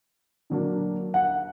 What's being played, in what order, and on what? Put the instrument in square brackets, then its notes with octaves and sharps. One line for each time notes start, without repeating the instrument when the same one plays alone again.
[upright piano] D3 F#3 A#3 D4
[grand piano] F#5